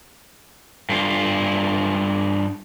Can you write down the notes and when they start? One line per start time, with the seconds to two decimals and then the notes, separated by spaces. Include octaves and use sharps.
0.89 G2 F4